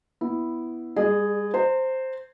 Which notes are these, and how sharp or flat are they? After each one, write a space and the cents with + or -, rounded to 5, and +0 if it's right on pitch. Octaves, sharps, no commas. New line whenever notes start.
B3 +0 E4 +0
G3 +40 G#4 +0 D#5 -45
C5 +0 A#5 -35